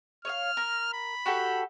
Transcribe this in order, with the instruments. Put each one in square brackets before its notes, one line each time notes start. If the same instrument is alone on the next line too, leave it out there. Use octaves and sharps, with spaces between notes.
[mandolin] C#5 D#5 F5 [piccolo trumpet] F6
[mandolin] A#4
[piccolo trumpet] B5
[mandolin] F#4 G4 A4